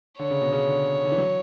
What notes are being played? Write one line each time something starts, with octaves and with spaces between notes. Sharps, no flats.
D3 C#5
C#3
B2
C#3
D3
D3
E3
F#3